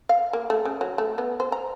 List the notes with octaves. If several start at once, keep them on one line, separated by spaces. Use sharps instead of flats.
F5
A#3
A3
C#3
F#3
A3
B3
C5
A#5